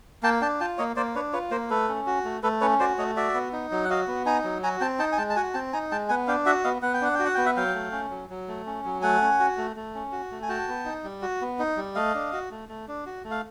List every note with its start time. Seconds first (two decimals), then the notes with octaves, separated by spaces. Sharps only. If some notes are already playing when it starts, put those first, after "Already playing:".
0.23 A#3 G5 A5
0.41 D4 G5 A5
0.60 F4 G5 A5
0.78 A#3 C#5 D#5
0.96 A#3 C5 D5
1.15 D4 B4 C#5
1.33 F4 B4 C#5
1.51 A#3 A#4 C5
1.70 A3 A4 B4
1.88 C#4
2.07 F#4
2.24 A3
2.43 A3 A4 B4
2.61 C#4 B4 C#5
2.79 F#4 C5 D5
2.98 A3 C#5 D#5
3.16 F#4 D5 E5
3.34 B3
3.53 D#4
3.71 F#3
3.84 F#5
3.90 F#4 D#5 F5
4.07 B3
4.26 D#4 G#5 A#5
4.44 F#3
4.63 F#4 G#5 A#5
4.81 C4 G5 A5
4.99 D#4 G5 A5
5.12 G#5
5.18 G#3 G5 A5
5.30 A5
5.36 F#4 F#5 G#5
5.54 C4 G5 A5
5.73 D#4 G#5 A#5
5.91 G#3 G5 A5
6.09 B3 F#5 G#5
6.27 D4 F5 G5
6.46 F#4 E5 F#5
6.64 B3 D#5 F5
6.82 B3 F#5
6.94 G5
7.01 D4 F#5
7.15 F#4 G5
7.25 F#5
7.34 B3 G5
7.46 E5 F#5
7.57 F#3 F5 G5
7.74 A3
7.92 C#4
8.10 F#3
8.30 F#3
8.48 A3
8.66 C#4
8.85 F#3
9.02 A3 F#5 G#5
9.21 C#4
9.40 F#4
9.57 A3
9.76 A3
9.95 C#4
10.12 F#4
10.31 A3
10.42 G#5
10.49 F#4 G5 A5
10.68 B3
10.85 D#4
11.04 G3
11.22 F#4
11.41 B3
11.59 D#4
11.77 G3
11.95 A3 D#5 F5
12.14 D4
12.32 F#4
12.51 A3
12.69 A3
12.88 D4
13.06 F#4
13.24 A3
13.31 F5